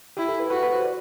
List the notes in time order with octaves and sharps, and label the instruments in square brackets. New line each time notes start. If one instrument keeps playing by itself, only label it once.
[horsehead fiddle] E4 [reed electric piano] G4
[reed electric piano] A4
B4
[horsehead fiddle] F#4 [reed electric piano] B4
[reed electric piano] B4
C5
D5